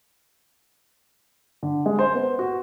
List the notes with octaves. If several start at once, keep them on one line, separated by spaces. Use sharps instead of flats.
D3
G#3
C5
B3
F#4